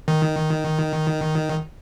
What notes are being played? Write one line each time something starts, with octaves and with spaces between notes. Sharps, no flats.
D#3